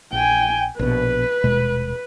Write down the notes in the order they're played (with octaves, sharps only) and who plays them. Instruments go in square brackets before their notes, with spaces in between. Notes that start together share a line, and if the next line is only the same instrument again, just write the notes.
[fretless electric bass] A#1 [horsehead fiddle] G5 G#5
[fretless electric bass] A#1 B2 [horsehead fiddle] B4
[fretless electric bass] D#1 B2 G#3